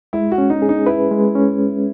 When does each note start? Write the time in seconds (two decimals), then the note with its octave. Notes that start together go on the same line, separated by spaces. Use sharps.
0.13 G#3 E4
0.32 F#4
0.38 C#4
0.50 D#4
0.62 G#4
0.69 D#4
0.86 E4 B4
1.11 G#3
1.35 C#4